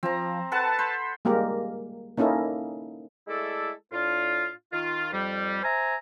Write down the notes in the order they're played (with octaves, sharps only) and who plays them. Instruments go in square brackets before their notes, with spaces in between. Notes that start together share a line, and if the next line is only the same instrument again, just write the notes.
[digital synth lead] F3 [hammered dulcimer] C4 A#5
[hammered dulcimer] A4 B4 F#5 [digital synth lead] A5
[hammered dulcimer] C5 B5
[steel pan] G3 G#3 A#3 G4 A#4
A#3 C#4 D#4 E4 A4
[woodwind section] G#3 A3 E4 A4 D5
A2 D4 F4
D#3 F4
F2 G3
C5 E5 G#5 A#5